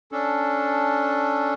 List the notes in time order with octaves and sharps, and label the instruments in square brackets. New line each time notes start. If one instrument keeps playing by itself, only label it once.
[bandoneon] C#4 D4 A4